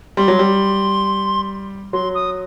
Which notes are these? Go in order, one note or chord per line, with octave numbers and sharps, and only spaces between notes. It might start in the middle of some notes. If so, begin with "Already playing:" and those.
G3 C6
F#3
G3
F#3 C6
D#6